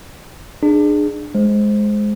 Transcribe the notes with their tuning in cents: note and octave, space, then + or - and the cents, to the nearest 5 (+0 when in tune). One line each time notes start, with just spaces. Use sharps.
D4 +30 G#4 +0
G#3 +10 C5 +0